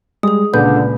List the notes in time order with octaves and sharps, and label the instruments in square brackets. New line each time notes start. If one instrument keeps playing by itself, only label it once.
[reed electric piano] G3 G#3 [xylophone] G#4 D#6
[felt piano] C#2 A#2 [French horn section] D3 [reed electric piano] B4 [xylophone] G6